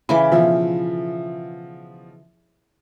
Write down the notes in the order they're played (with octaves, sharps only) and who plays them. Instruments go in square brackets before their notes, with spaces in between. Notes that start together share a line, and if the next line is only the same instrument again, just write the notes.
[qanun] C#3 E3 D6 [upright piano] B5
[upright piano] B2 F3 E5